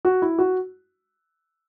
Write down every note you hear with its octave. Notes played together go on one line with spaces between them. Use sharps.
F#4
E4
F#4